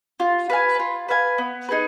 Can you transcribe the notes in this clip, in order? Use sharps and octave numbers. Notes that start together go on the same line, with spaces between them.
F4
B4 F5 G#5
F4
B4 F5 G#5
B3
D#4 G#4 B4